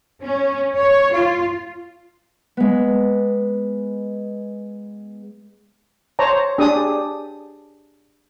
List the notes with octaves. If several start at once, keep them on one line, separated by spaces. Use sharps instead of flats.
C#4
C#5
F4
G#3 B3
C5 C#5 A5 A#5
D4 G4 G#4 D#6